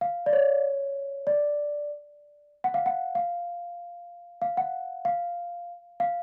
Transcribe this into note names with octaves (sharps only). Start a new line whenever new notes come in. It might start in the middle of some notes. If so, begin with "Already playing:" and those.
F5
D5
C#5
D5
F#5
F5
F#5
F5
F5
F#5
F5
F5